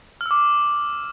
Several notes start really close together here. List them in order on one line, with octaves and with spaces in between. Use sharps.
F6 E6 D6